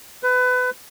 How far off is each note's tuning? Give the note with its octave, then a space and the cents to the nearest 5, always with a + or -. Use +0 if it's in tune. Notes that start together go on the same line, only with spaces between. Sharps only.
B4 +25